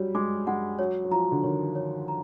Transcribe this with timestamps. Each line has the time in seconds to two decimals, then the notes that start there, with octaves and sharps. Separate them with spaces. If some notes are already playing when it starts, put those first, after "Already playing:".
Already playing: F#3 G3 C#5
0.15 G#3 D6
0.47 G#3 F#5
0.79 F#3 C#5
1.05 F#3
1.11 F3 A#5
1.32 D3
1.43 D#3 C#5
1.75 C#5
2.08 A#5